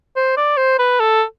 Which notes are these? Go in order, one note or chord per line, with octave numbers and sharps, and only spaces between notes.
C5
D5
C5
B4
A4